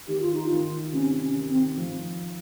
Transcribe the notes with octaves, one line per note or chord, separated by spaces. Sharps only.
D#3 G4
F4
D#4
D#3 F4
C3 C#4
C#4
D#3
C4
F3